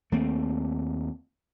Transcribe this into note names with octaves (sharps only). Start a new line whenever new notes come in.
D#2 A3 A#3 C4